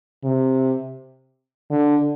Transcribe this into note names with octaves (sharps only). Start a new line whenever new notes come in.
C3
D3